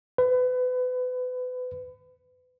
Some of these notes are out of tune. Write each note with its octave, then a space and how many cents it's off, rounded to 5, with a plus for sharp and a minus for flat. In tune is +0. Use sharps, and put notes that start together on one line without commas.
B4 +30